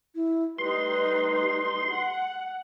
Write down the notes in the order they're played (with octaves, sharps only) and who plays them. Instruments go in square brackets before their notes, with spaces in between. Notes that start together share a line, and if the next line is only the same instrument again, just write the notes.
[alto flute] E4
[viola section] G3 A3 D#4 [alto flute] B4 [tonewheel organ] C6
[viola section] F#5